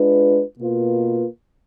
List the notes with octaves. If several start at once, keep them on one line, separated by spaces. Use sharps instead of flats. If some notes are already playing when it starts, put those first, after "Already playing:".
Already playing: G#3 D4 F4 B4
B2 A#3 F4 B4